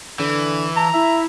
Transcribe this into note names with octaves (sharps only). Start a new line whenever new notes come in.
D3 E3
A5 A#5
E4 E5